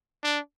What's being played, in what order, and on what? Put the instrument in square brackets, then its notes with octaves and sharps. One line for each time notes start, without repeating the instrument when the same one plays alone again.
[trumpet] D4